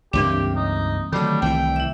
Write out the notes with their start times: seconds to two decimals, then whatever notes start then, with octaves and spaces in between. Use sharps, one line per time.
0.13 C#2 G2 E3 A#3 C4 D4 G4
0.56 D#4
1.12 D3 D#3 F#3 G3 A3
1.42 C2 E3 G5
1.76 E4 E5